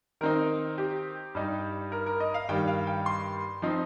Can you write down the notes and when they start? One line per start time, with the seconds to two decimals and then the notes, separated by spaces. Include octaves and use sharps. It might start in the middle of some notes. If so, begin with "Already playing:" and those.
0.21 D#3 C4 D#4 A#4
0.78 G4
1.35 G2 G3 D#4
1.92 A#4
2.06 A#4
2.20 D#5
2.34 F5
2.49 G2 D#3 G3 G5
2.67 F5
2.87 G5
3.06 C6
3.62 F3 C4 D#4